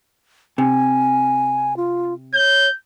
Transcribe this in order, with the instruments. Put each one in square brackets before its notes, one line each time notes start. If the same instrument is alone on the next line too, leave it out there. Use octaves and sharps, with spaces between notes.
[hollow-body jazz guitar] C3 [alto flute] G#5
[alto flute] F4
[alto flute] C#5 [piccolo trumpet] G6